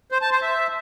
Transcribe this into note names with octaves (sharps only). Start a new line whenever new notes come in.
C5
A5
C5
E5